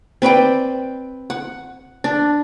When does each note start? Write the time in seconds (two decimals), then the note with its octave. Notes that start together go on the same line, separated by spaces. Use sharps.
0.22 C4 B4 D5 G5
1.30 F#5
2.04 D4